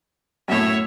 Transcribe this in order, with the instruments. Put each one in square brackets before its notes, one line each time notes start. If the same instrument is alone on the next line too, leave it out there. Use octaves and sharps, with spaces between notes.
[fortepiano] F#2 A2 [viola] C#5 E5